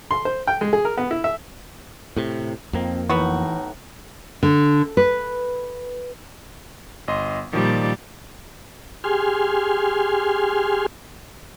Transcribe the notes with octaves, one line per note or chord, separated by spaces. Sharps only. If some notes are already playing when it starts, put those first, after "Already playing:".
C6
C5
G5
G#3
G#4
A#4
B3
E4
E5
A2 C3
F2 D#3 F3 A#3 C4
A2 E3 B3 D#4 F#4
D3
B4
G1 D#5 C6
A#2 D#3 F3 G3 D5
G4 G#4 G#5 C6 F6